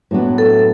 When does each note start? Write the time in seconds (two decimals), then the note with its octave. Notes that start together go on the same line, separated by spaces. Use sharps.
0.11 A2 F#3 B3 D4
0.38 A4